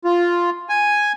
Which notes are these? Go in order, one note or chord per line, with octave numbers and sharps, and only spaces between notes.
F4
G#5